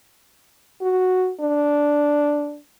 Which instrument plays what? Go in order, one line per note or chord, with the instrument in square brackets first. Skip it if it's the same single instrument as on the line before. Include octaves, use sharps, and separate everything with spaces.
[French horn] F#4
D4